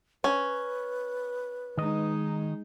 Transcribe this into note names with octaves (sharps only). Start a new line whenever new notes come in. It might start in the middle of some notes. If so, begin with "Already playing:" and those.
C#4 B4
D#3 G#3 D#4 D#5